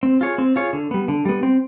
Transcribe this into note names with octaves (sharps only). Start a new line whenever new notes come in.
C4
F4 G#4 C#5
C4
F4 G#4 C#5
D3
G3 B3
D3
G3 B3
C4